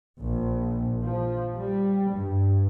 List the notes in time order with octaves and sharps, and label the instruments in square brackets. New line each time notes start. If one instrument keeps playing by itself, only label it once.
[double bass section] A#1
F3
G3
G2